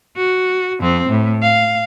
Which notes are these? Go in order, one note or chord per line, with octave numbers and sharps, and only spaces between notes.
F#4
F2 C4
A2
F5